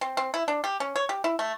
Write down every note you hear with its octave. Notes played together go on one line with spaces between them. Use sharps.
C4
C4
E4
D4
G4
C#4
C#5
G4
E4
A3